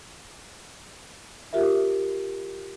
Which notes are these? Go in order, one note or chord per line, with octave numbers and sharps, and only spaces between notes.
F4 G4 A#4 E5